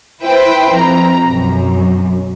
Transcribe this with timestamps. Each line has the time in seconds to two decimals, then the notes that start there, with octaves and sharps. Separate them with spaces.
0.23 E4 B4 C5 G5
0.72 F2 A#5
1.28 B1 F#2